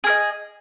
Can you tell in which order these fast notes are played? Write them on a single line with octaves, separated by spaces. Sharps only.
G#4 A#4 D#5